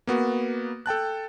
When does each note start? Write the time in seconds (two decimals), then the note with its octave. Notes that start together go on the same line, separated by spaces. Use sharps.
0.07 A#3 B3 F#4
0.86 A4 G5 A5 F#6